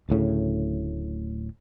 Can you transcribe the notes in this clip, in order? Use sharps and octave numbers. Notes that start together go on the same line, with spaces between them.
D1 D2 A2 C#3